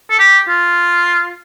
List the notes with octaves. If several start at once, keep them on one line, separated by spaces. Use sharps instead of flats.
A4
G4
F4